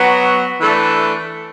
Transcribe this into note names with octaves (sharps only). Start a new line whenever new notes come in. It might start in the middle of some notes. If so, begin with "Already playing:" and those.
Already playing: F#3 B3 F#4
E3 A3 D4